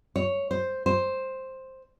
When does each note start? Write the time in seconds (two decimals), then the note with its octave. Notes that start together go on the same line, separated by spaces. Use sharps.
0.16 C#5
0.51 C5
0.86 C5